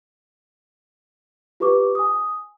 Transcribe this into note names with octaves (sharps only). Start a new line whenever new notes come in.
F4 G4 B4 C#6 D6
G#5 D#6